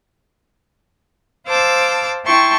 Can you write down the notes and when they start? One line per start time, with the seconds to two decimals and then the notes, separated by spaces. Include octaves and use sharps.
1.46 C5 F5 A5 D6 E6
2.24 E4 G5 A5 C6 C#6